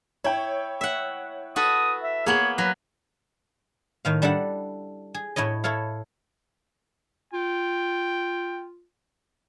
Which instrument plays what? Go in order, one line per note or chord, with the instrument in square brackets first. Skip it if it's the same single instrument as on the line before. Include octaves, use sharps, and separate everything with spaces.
[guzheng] E4 [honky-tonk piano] C#5 G5
[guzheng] E5 F#5
[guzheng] F#4 A4 B4 [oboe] D#6
[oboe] E5
[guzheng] A#3 B3 [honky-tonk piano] G#4 F#7 [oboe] C#5
[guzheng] F#3 [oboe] B4 [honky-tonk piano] A#6
[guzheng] A2 D#3 F5
G3 D4 E4 A4 F#5
G#4
A2 E4 C#5 D#5
E4 A4 C#5 F5
[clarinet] F4 [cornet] G5